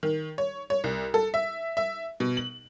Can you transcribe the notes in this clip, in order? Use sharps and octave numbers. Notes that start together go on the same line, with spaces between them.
D#3
C#5
C#5
C2
A4
E5
E5
B2
F#7